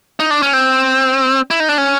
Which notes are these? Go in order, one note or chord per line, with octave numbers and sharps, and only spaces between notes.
D#4
D4
C#4
C4
E4
D#4
D4
C#4